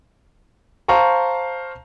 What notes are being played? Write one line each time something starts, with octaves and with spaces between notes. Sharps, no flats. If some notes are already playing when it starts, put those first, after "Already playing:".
C5 F5 A5 A#5 C#6